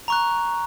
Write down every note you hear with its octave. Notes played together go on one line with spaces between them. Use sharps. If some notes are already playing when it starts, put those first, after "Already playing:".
A#5 C#6 F#6